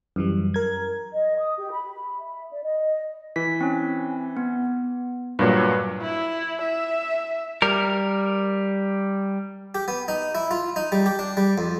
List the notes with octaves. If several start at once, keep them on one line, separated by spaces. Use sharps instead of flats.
F#2 E3 G3
A#4 G#6
D#5
D#6
G4
B5
E5
D5
D#5
E3 B6
C4 C#4
B3
G2 A#2 F#3 B4
E4
E5
G3 A#4
G4
B3
D#4
E4
F4
D#4
G3
G4
D4
G3
F2